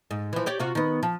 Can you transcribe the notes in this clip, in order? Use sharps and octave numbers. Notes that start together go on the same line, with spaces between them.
G#2
E3 F3
G4 C#5 D5
C3 F4 F#4
D#3 B3
F3